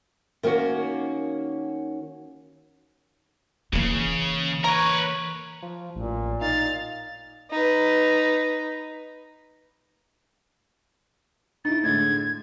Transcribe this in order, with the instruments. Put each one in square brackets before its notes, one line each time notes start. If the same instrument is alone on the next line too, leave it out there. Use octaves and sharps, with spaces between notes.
[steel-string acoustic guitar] D#3 A#3 C#4 F#4
[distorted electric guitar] C#3 [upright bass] E3 A#3
[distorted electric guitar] A#4 B4 [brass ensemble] C#5 [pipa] A#5
[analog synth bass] F3
[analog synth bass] A1 [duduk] A#2
[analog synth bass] D#4 [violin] F5 A6
[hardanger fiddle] D#4 B4
[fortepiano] D#4 E4 [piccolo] A6
[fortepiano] A2 D3 G#3 [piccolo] G#6